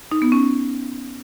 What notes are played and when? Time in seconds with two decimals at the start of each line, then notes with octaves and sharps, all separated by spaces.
0.12 D#4
0.22 B3
0.32 C#4